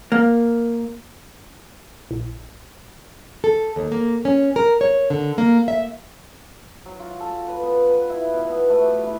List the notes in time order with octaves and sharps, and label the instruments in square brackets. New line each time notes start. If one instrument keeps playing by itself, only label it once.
[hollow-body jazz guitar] A#3
[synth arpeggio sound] A#1
[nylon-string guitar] A4
D#2
A#3
C#4
A#4
C#5
D3
A#3
E5
[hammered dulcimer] F#3
F4
A4
B4
B3
B4
E4
B2
B3
A3
G4
E4